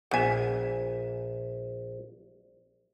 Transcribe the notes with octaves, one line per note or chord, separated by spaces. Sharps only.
A#1 B3 E5 G#5